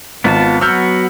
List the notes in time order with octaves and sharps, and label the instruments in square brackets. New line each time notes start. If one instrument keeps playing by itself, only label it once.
[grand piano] G#1 [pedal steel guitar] B3 F4 A5
[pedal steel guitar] F#3 B3 F#4 [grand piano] E6 F6 G6